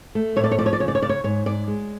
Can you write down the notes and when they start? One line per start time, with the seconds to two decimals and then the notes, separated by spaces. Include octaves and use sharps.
0.15 A3
0.36 A2 C#5
0.44 D5
0.51 C#5
0.58 F3 D5
0.66 C#5
0.73 D5
0.80 C#3 C#5
0.88 D5
0.95 C#5
1.02 C#3 D5
1.09 C#5
1.24 G#2 C#5
1.46 G#2 D5
1.68 G#3